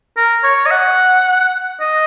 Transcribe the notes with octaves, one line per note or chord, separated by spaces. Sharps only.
A#4
C#5
D#5
F#5
D#5